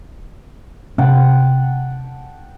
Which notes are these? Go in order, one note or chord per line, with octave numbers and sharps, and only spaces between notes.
C3 C#4 F#5 G5 A5